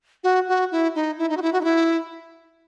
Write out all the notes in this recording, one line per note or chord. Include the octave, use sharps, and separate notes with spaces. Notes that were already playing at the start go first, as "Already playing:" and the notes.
F#4
F#4
E4
D#4
E4
D#4
F#4
E4
F#4
D#4
E4